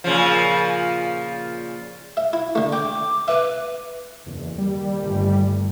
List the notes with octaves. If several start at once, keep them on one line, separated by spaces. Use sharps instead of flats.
A#2 C#3 F3
E5
E4
D3 A3
G5 D6
B4 E5
F#1 E2
D#2 G3
G1 A2